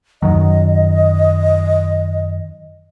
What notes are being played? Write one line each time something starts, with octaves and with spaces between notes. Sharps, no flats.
F#2 D#3 F#3 D#5